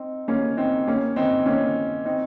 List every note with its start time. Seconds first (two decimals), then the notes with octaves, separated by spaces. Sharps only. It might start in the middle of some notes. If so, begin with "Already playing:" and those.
Already playing: C4 D#4
0.28 A#3 C#4
0.57 C4 D#4
0.87 A#3 C#4
1.16 C4 D#4
1.46 A#3 C#4
2.05 C4 D#4